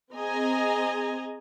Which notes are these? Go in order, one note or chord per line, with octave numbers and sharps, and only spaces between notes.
C4 G#4 D#5 G#5 A#5